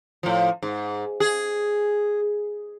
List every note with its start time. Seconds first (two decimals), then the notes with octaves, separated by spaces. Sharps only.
0.23 A2 F3
0.62 G#2
1.20 G#4